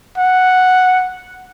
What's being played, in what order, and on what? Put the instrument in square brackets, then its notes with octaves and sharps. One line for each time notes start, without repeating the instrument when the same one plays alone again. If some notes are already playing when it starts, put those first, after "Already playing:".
[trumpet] F#5